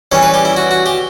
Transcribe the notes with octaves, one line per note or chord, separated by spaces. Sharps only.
E3 G3 C#4 C#5
B4
G4
E4
F#4
F#4
G4